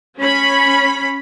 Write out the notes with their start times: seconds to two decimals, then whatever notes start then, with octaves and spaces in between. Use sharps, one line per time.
0.18 C#4 B5